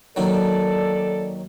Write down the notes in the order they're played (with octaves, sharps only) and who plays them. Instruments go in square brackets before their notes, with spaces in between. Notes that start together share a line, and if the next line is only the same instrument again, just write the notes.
[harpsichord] D#2 D#3 F#3 [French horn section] A4 D5